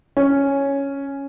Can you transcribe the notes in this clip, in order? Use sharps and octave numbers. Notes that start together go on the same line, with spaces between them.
C#4